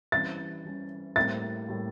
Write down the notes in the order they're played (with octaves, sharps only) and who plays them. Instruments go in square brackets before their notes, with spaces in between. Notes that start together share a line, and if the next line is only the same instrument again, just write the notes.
[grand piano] E3 G3 C#4 [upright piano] A6
[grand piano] E3 G3 C#4
[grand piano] A2 G3 A#3 [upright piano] A6
[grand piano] A2 G3 A#3